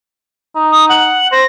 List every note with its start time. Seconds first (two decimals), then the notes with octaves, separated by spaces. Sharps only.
0.56 D#4
0.71 D#6
0.89 F#5
1.32 C5 A#6